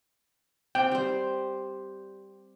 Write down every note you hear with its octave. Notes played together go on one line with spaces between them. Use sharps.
C4 G5
G3 C5